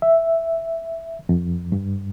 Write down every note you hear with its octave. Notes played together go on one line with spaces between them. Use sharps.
E5
F2
G2